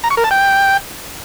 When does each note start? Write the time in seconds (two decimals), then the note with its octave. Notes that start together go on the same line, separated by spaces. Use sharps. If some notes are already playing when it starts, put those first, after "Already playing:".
0.04 A#5
0.10 C#6
0.17 A#4
0.24 A5
0.31 G5